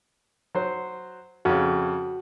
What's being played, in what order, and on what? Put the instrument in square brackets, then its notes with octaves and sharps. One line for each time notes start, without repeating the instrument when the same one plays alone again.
[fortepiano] F#3 C5
[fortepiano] F2 C#3 [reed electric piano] F#4